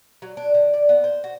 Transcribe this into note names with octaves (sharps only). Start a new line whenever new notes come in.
F#3
D4
D3
D5
B3
C5
F#4